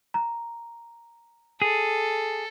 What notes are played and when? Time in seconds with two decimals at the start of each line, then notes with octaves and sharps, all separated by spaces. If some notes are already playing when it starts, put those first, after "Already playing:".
0.14 A#5
1.62 G#4 A4